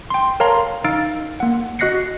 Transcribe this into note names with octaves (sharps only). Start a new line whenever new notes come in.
G5 C6
A#4 C#5 F5 A5 A#5 C6
D#4 F5 E6 F6 A6 D7
A#3 F#5
F#4 D#5 F#6 A#6 C7 C#7